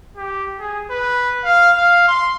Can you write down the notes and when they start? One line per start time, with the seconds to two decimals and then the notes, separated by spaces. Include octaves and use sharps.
0.17 G4
0.60 G#4
0.91 B4
1.45 F5
1.77 F5
2.08 C6